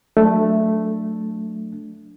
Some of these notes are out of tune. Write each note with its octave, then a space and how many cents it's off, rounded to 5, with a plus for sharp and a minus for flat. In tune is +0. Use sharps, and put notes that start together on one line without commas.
F#3 -20 A3 +0 D4 +0